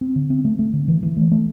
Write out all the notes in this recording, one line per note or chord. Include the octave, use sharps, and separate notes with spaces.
C4
D3
C4
A3
A3
D3
E3
E3
A3
A3